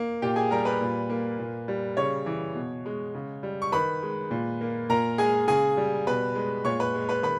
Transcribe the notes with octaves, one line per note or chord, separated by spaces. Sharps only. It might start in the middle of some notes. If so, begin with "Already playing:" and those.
Already playing: A#3
A#2 G4 G5
G#4 G#5
G3 A#4 A#5
B4 B5
A#2
A#3
A#2
G3
C#3 C#5 C#6
E3
B2
G#3
C#3
G3
C#6
D#3 B4 B5
G#3
A#2
A#3
A#2 A#4 A#5
G#3 G#4 G#5
C#3 G#4 G#5
G3
B2 B4 B5
G#3
A#2 C#5 C#6
B4 B5
G#3
B4 B5
D#3 B4 B5